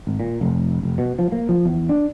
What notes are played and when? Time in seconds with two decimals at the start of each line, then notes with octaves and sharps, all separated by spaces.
0.07 G#1
0.20 A#2
0.41 F1
0.83 F1
0.98 B2
1.19 F3
1.32 A#3
1.49 F3
1.65 E2
1.89 D4